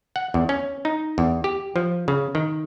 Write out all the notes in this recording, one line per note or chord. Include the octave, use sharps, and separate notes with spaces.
F#5
E2
C#4
D#4
E2
G4
F3
C#3
D#3